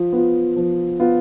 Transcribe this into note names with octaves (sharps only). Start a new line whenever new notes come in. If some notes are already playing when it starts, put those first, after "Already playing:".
Already playing: F3
B3 F4
F3
B3 F4